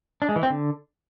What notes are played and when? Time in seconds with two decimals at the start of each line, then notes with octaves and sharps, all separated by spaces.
0.22 D4
0.29 G#3
0.36 E3
0.43 C4
0.50 D3